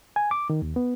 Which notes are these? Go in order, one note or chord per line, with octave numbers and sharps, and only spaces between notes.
G#5
D6
D#3
D#2
B3